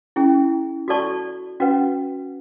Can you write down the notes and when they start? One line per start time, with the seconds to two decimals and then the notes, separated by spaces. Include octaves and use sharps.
0.16 C#4 E4 G#4
0.88 F#4 A4 D5 A5 C#6
1.60 C#4 F#4 B4 F#5